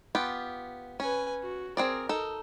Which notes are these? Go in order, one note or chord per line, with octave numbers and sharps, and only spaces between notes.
B3 F4 G4
C#4 B4 G#5
F#4
C4 G#4 A#4 D5
D#4 A4